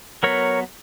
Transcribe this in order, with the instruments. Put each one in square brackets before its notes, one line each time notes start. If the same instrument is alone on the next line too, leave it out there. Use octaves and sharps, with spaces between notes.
[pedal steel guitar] F#3 B3 A#4 C#5